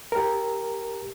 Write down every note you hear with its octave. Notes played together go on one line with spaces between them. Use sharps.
G4 A#4